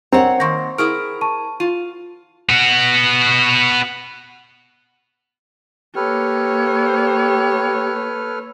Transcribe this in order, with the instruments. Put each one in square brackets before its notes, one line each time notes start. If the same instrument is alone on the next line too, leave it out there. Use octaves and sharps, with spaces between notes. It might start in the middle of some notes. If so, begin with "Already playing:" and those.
[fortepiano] C4 [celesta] A#4 D#5 A#5 [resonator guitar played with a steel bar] C#5 F#5
[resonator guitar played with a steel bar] D#3 A#3 [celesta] C6 C#6 A#6
[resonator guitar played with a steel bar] E4 G#4 A#4 [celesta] C#6 F6 D7
[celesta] A5 C#6 D#7
[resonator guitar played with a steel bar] F4 [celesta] D#7
[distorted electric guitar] B3 F#4
[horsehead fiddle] A#3 C#5 [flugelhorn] G4 [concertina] A4 B4 F6